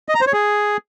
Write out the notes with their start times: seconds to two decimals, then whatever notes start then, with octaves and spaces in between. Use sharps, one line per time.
0.09 D#5
0.15 A#5
0.21 C5
0.27 C#5
0.33 G#4